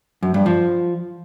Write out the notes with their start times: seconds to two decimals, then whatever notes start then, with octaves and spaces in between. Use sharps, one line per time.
0.23 F#2
0.34 G2
0.46 F3